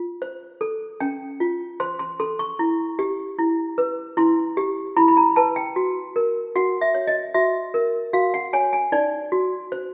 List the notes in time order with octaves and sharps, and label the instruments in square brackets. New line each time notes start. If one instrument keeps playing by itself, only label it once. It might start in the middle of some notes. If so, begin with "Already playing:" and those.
Already playing: [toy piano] F4
C5
A4
C#4 G5
F4
C5 C6
C6
A4 C6
C#6
E4
G4
E4
B4
E4 C6
G4
E4 B5
B5
A#5
B4 A5
G5
F#4
A#4
F#4 F#5
E5
C#5
D#5
F#4 E5
A#4
F#4 F5
F#5
C#5 G#5
G#5
D#4 D5
F#4
C5